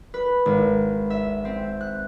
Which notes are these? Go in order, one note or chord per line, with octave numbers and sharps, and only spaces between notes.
B4
G#1
E5
C4
F#6